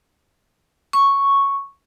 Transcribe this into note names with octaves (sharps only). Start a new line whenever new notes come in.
C#6